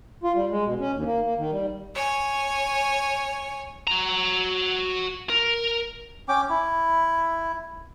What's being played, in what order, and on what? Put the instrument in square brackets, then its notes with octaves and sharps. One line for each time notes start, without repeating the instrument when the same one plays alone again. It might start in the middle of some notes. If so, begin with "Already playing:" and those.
[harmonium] F4
G3
G#3
B2
C#4
D#2
A#3
A#3
D#3
G3
[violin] C#5 G#5
[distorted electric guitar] F#4 A#5
A#4
[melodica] C#4 G5 D6
E4